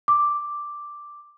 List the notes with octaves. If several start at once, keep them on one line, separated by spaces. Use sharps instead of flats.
D6